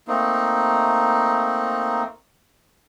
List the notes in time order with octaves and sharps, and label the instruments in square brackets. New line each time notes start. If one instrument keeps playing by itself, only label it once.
[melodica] A3 A#3 C4 D#4